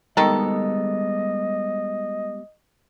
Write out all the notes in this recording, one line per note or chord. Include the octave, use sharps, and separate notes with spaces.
D#3 G3 G#3 B3 A4 D#5